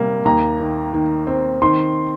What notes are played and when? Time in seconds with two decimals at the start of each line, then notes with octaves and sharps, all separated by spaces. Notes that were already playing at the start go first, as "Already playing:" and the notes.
Already playing: C3 G3 A#3
0.25 D#2 A#5
0.60 D#3
0.93 D#3
1.27 C4
1.62 D#3 C6